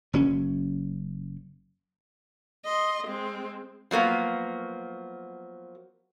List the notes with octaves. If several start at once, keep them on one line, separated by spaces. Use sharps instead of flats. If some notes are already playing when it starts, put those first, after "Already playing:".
F#1 F#3 C#4
D#5 C6
G#3 C4
F3 F#3 A#3 B3